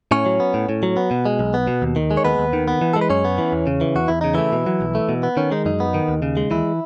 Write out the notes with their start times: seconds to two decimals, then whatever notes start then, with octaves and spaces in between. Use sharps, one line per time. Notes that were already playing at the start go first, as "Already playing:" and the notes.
0.11 A2 C#4 C#5
0.26 F#3
0.40 B3
0.54 A2
0.69 A2
0.83 F#3
0.97 B3
1.11 B2
1.25 G#3
1.39 B1
1.54 B3
1.67 B2
1.82 D#2
1.96 D#3
2.11 G#3
2.17 C#5
2.24 D#2 B3 B4
2.39 D#2
2.53 D#3
2.68 B3
2.81 E3
2.93 A4
2.96 G#3
3.01 B4
3.09 F#2 C#4 C#5
3.25 B3
3.38 E3
3.52 E2
3.67 C#3
3.81 E3
3.96 E2 F#4
4.08 E2 E4
4.21 C#3 D#4
4.34 E3 A3 E4
4.52 B2
4.66 F#3
4.81 B1
4.95 A3
5.09 B2
5.23 B3
5.37 D#3 C#4
5.51 G#3 D#4
5.65 F#2 D#4
5.80 B3
5.94 D#3
6.08 D#2
6.22 C#3
6.37 G#3
6.51 D#2 E3 E4